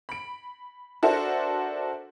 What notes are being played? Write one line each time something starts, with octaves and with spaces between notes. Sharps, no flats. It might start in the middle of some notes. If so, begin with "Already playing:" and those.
B5 D7
D4 F#4 A4 A#4 C5 E5